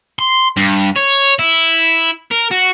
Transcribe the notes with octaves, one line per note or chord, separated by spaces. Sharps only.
C6
G2
C#5
E4
A#4
F#4